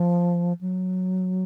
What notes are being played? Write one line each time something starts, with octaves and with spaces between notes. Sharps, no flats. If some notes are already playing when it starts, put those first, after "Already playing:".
Already playing: F3
F#3